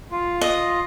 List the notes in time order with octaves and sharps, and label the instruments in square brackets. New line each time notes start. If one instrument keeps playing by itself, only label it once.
[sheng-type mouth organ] F4
[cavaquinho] D#5